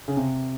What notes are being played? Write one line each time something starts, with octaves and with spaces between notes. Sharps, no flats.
C#3
C3